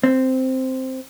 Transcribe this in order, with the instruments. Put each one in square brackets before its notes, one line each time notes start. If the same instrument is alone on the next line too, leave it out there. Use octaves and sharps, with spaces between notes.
[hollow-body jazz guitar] C4